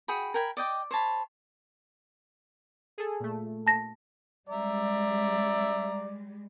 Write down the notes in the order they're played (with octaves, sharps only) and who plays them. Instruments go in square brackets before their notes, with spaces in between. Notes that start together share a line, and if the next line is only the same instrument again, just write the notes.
[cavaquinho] F#4 G#4 G5 B5
A#4 G5 G#5 B5
D5 D#5 G5 D6
C5 C#5 A5 B5
[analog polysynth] G#4 A4
A#2 A3
[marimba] A5 A#6
[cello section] G3 G#3 [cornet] D5 [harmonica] E5 A#5